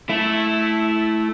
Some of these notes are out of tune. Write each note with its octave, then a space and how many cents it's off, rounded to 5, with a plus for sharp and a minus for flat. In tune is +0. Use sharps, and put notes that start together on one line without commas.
A3 -15 E4 +0